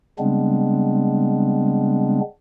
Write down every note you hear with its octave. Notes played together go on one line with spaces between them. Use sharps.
C#3 G3 G#3 B3 C4 D4